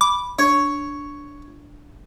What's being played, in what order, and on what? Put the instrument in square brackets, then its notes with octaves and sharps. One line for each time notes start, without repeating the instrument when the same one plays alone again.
[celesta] B5 [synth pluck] D6
[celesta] D4 [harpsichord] C#5